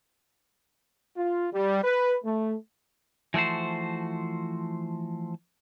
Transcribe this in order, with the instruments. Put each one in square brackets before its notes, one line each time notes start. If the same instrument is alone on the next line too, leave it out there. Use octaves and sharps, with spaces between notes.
[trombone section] F4
G3
B4
A3
[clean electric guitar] E3 F3 A3 F#4 C5